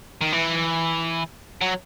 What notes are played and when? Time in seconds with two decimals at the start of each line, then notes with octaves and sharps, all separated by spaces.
0.21 D#3
0.33 E3
1.61 F#3